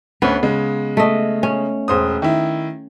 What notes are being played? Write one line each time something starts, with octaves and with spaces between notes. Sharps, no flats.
D2 B3 C#4
C#3 G#3
A3 D#5
C#4
E1 C5 D#6
D#3 E4